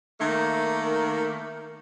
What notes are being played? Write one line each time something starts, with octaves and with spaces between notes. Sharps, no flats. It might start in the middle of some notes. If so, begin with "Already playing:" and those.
D#3 A3 A#3